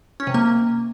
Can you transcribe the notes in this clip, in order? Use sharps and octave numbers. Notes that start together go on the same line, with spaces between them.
C#4
C3
A#3